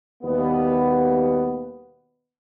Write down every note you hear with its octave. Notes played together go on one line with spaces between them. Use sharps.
D#2 B2 G3 B3